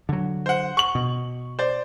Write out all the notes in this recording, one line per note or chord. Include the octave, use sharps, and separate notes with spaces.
D3 F#3
C5 F#5
C#6 F#7
B2
C5 D5